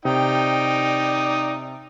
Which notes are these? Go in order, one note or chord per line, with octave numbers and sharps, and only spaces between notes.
C3 D#4 D5 G5